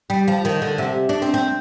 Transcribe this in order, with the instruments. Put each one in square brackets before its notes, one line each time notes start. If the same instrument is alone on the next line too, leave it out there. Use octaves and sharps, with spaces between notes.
[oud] G3
F3
D#3
D3
C3
D4
C4
C4